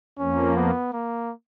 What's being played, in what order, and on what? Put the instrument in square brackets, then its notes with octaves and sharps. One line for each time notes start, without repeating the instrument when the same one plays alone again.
[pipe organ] F2 F3 A#3 [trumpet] C#4
[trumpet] B3
A#3